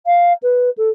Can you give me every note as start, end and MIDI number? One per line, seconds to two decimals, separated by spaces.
0.06 0.33 77
0.42 0.69 71
0.77 0.89 69